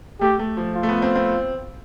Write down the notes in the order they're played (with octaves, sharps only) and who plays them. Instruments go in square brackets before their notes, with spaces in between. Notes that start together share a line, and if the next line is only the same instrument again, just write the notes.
[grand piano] A3 [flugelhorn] G4
[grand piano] A3
F3
[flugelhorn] F4
[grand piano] A3
B3
C4
C4